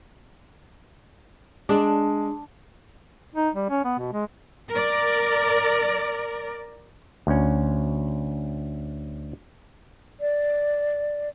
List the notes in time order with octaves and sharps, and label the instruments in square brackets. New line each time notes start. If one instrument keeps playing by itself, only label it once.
[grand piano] G#3 [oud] D4
[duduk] D#4
G3
C#4
B3
B2
G#3
[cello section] A#4 D5
[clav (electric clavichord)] D2 C#4
[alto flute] D5